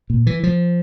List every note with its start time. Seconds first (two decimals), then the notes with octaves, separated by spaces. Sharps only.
0.10 A#2
0.27 E3
0.43 F3